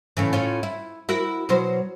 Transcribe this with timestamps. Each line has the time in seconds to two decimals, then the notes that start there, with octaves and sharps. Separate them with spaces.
0.17 A2 C#3 E3
0.33 A2 C#4 F4
0.63 E4
1.09 E4 F#4 A#4
1.49 B2 F#3 C5